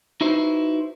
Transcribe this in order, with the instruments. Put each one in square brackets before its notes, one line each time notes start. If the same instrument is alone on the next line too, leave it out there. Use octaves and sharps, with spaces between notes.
[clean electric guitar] D#4 E4 F#4 B4 C5